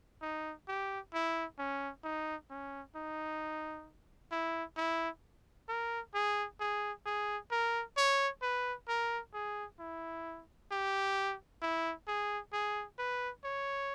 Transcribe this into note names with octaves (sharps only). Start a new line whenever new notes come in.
D#4
G4
E4
C#4
D#4
C#4
D#4
E4
E4
A#4
G#4
G#4
G#4
A#4
C#5
B4
A#4
G#4
E4
G4
E4
G#4
G#4
B4
C#5